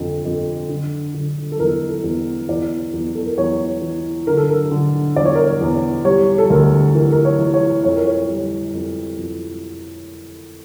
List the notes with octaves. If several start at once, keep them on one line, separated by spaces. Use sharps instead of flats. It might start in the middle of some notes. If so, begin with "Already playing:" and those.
Already playing: F2 D3
F2
D3
D3
A4
E2 A#4
A4
E2
E2 D5
E2
A4
A#4
E2 C#5
E3
D3 A#4
A4
A#4
D3
E2 D5
C#5
A#4
C#5
E2
G3 C#5
A4
D2 A#4
E3 A#4
A#4
C#5
E3
C#5
F2 C#5
A#4
C#5
G3
F2
F2